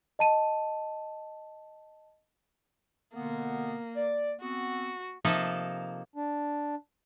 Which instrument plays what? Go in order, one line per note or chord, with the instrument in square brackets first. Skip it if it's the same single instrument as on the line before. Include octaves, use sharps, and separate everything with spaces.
[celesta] D#5 A5 D#7
[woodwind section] B2 D3 B3 [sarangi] A#3
[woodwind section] D5
[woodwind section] B3 C4 [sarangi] F#4
[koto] C3 F3 A#3 D#4 A4
[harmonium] D4